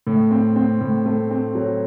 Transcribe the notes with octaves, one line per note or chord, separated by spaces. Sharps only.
A2
C4
C4
A2
A3
C4
F#3